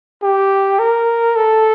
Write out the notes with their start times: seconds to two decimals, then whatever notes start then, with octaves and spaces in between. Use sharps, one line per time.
0.22 G4
0.79 A#4
1.36 A4